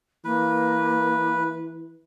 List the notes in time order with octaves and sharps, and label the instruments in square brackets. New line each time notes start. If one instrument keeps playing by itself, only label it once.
[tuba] E3 [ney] A#3 [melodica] B4